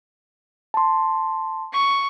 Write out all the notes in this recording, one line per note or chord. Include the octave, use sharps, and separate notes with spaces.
A5 C6
C#6